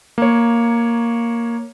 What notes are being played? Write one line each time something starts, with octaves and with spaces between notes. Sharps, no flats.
A#3 C#5